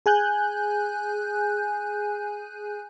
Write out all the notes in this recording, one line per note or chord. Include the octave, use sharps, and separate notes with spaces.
G#4 G#5 F#6 G6